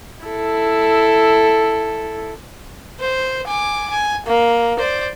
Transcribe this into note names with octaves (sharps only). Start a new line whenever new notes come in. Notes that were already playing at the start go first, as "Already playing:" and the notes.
E4 A4
C5
G#5 D6
G#5
A#3
C5 D5